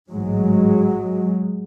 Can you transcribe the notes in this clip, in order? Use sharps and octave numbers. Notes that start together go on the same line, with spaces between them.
A1 G#2 F#3 G#3